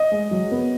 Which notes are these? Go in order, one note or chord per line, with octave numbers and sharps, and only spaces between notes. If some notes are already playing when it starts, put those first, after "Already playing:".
Already playing: D#5
G#3
F#3
B3